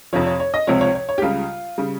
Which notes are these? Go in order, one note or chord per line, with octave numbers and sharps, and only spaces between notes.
F2 C3 F3 C#5
C#5
C#5
D#5
C#2 C3 F3 C#5
C#5
C#5
C#5
G4
C#2 C#3 G3 F4
C#3 G3